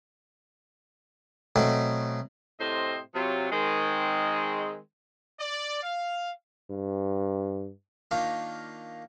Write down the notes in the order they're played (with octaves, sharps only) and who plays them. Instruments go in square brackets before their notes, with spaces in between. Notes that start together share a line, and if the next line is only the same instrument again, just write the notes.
[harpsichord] B2 F#3 A3 C4
[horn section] A2 C3 C4 C5 D#5
C3 F#3 F4
D#3 G#3 C4
[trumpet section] D5
F5
[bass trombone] G2
[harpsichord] D#3 A#3 D4 F4 C5 C#5